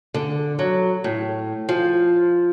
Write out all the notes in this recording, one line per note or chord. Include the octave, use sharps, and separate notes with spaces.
D3
F#3
A2
F3